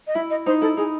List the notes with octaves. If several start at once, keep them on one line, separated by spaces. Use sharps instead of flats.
D#5
E4 E5
D#5
D#4 C5
E4 A4
D#4 G#4